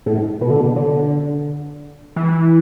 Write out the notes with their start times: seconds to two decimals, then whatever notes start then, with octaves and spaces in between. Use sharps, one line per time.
0.06 A2
0.41 B2
0.50 D3
0.61 B2
0.76 D3
2.16 E3